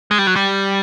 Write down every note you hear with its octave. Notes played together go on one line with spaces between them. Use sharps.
G#3
G3
F#3
G3